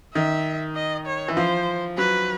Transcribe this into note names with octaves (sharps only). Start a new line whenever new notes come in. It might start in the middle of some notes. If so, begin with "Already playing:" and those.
D#3 E5
D#5
C#5
E3
F3 C5
F#3 B4